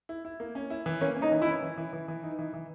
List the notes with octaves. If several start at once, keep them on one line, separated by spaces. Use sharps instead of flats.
E4
E4
A#3
C#4
E4
E3
A#3 C#4
C#4
D#4
E3
E4
C#4
E3
E3
E3
E3
D#4
E3
E3